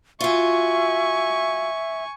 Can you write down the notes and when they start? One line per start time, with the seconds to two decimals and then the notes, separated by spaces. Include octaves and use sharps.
0.21 F4 F#4 E5 G#5 C#6